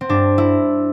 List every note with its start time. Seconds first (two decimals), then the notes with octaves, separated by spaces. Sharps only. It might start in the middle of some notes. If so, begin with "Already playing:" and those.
0.01 C4
0.09 G2 D4
0.38 E4